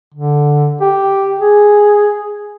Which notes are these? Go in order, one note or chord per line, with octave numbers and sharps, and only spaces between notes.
D3
G4
G#4